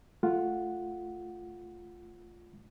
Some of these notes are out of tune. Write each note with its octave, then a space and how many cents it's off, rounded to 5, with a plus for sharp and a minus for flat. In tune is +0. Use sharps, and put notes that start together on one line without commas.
A3 -5 F4 +0 F#5 +0